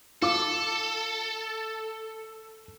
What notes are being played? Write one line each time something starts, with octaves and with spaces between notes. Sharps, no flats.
F4 A4 D6